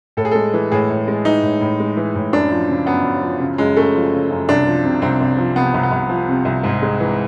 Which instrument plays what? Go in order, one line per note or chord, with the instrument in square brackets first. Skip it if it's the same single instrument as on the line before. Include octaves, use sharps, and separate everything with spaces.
[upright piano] A2 [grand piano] A4
[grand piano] G#4
[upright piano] G#3 [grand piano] A4
[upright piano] E3
[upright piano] A2 [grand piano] G#4
[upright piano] A2
G#3
[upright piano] E3 [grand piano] D#4
[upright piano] A2
A2
G#3
E3
A2
[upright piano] F#2 [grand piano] D4
[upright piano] F3
C#3
[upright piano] F#2 [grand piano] B3
[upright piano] F#2
F3
C#3
[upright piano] F#2 [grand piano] G#3
[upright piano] F#2 [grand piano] A3
[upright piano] F3
C#3
F#2
[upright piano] C2 [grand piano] D4
[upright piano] F3
C3
[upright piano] C2 [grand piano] C4
[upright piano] C2
F3
[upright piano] C3 [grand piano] B3
[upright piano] C2
[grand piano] B3
[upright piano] C2
F3
C3
C2
G#2
G#3
E3